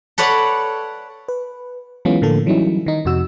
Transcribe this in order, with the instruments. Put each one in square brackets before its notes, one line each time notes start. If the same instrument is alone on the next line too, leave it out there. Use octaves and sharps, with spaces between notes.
[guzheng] A4 B4 C#5 D5 F#5
[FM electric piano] B4
E3 F#3 G#3 B3 C#4 F4
A2 D3 F3 A#3 A4
E3 F#3 G3 C#4 D#4 E4
D#3 D#4
F2 C3 F#4 E6